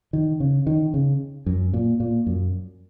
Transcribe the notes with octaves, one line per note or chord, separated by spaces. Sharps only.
D#3
C#3
D#3
C#3
F#2
A#2
A#2
F#2